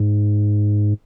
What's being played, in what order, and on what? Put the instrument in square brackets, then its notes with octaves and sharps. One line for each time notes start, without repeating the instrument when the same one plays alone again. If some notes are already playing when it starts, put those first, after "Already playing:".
Already playing: [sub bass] G#2